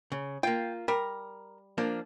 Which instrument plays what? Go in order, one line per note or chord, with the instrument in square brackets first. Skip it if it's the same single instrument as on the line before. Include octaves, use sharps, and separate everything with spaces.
[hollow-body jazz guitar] C#3
[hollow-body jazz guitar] A#3 F4 [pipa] G5
[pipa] G3 [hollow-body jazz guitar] A#4
[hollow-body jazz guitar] F3 A#3 D4